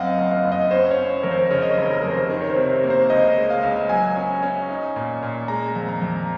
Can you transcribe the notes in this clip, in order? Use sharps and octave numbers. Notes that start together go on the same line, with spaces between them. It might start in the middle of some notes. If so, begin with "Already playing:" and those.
Already playing: F#2 C4 D#5 F5 F#5
F#1
F5
F#1
D#5
C#4 C5
C#5
C#4
F2 A#4
C5
C#3 C#5
D#5
C#5
F1
A#4
F1
C5
D#3 A#4
C#5
C5
C3
C5
A#3
C5
C#2 D#5
G#3
F5
C#2
F#3 G#5
C#4
C#4
D#4
A#2
A#2
G#3 A#5
F2
A#5
F2